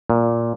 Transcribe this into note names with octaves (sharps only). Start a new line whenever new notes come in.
A#2